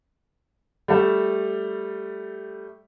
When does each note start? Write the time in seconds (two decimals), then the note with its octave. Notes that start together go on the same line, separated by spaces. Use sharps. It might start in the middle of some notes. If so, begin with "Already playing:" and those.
0.88 G3 A3 E5